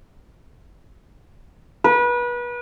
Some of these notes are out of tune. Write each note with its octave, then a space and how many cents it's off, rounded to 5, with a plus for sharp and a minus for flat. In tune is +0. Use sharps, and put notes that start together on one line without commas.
B4 -30